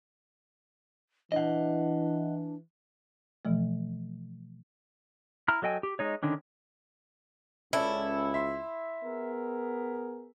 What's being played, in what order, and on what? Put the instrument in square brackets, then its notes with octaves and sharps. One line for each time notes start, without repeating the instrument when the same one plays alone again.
[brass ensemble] E3 [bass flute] D4 [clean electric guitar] D#5 F#5
[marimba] B2 E3 F3 A3
[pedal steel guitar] E4 A#5 F6
F#3 A4 D#5 G5 G#5
G4
G#3 D#4 C#5
D3 D#3 C#4 D4
[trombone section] C#2 [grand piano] C#4 A4 D5 [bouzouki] E4
[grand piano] E5 C6
[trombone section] B3 G#4 A#4